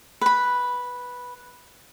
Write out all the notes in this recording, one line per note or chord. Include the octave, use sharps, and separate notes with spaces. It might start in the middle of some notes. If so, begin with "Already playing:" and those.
B4 B5